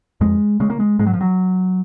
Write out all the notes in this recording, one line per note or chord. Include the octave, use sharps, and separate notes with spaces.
F2 G#3
C#3 G#3
A#3
G#3
G#2 G#3
F#3
F3
F#3